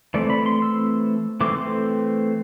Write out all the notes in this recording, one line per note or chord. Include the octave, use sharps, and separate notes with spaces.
E3 A3 C4 D5
B5
C6
E6
E3 A3 C4 D6
C6